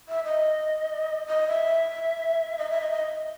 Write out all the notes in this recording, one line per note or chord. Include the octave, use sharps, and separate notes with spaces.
E5
D#5
D#5
E5
D#5
E5
D#5
D#5